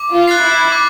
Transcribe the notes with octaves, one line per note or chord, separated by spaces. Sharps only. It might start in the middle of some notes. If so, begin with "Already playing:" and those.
Already playing: D6
F4
F#6 A6 C7
E4
D6